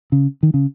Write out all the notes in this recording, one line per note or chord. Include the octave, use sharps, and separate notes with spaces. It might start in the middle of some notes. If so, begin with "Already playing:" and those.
C#3
D#3
C#3